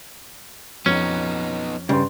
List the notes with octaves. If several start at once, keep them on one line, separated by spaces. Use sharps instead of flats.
F2 B3 C#4 D#4
G2 C#3 G3 B4 C6